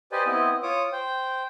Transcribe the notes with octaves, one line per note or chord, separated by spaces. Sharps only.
G4 B4 C5 D5 D#5 G#5
B3 C4 E4 D#5
F4 C#5 D6 D#6
C5 G5